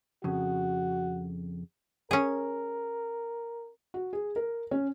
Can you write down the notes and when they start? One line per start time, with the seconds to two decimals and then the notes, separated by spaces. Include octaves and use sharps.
0.24 F2 C#3 F#4
2.11 C#4 G#4 A#4
3.94 F#4
4.13 G#4
4.36 A#4
4.71 C#4